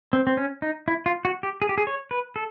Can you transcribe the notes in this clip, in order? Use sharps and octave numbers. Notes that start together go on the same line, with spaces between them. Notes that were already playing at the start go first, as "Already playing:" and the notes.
C4
C4
C#4
D#4
E4
F4
F#4
G4
G#4
G4
G#4
C#5
B4
A4